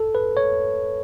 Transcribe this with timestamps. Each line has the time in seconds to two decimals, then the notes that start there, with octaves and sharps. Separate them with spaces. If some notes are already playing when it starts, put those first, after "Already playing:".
Already playing: A4
0.15 B4
0.37 C#5